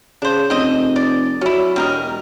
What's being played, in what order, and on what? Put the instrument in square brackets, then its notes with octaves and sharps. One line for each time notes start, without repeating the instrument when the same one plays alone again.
[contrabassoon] C#3 [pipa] D4 C5
[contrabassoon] F1 [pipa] C4 D#5
[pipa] D5
[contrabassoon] F#3 [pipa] C#4 E4
[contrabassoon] E1 [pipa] G3 A#4 D#5